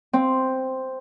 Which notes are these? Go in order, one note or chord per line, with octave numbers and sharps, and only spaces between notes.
C4